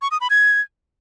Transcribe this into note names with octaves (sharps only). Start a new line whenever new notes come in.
C#6
D#6
B5
G#6